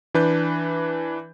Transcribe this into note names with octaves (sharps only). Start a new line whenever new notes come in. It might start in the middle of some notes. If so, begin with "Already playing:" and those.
E3 D4 B4 G6